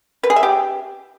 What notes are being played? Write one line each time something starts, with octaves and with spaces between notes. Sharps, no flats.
B4
G#4
E5
G4